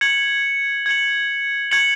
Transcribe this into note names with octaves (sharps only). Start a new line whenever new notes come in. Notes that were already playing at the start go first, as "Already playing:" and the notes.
G#6 C#7 F#7
G#6 C#7 F#7
G#6 C#7 F#7